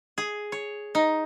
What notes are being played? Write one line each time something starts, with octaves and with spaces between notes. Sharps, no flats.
G#4
C#5
D#4